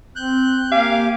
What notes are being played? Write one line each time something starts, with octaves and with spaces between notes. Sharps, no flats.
C4 F#6 G6
A#3 G4 F5 G#5 D6